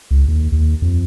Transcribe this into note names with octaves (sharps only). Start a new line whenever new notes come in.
C#2
D#2
D#2
F2